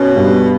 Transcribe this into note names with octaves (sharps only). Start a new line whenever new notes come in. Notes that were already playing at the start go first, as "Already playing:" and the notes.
Already playing: B2 C#4
G2